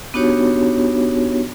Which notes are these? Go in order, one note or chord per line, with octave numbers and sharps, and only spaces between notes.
B3 D4 D#4 F#4 G4 C#5